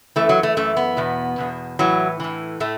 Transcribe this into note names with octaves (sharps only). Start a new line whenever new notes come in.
F#2 E3 A3
F#3
A3
F#2 E3 A3
B3
E2 B2
E2 B2
A2 E3 F#3
A2 E3
A2 A3